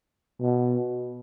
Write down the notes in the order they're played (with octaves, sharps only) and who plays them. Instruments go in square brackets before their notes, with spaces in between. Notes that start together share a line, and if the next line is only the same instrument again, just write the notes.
[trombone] B2